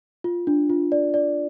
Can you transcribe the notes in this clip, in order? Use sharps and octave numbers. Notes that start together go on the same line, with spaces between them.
F4
D4
F4
D5
D5